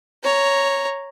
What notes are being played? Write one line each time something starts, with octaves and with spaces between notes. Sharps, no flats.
C#5 A#5